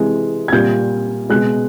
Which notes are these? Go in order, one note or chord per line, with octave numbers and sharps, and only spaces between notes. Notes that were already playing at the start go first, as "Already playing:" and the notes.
Already playing: C3 E3 G#3
G#6
A#2 G3 G6
B2 G#3 F#6